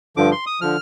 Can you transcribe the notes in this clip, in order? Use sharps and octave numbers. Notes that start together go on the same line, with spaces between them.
G2 D3 F3 D6
C6
D#6
D3 F3 F6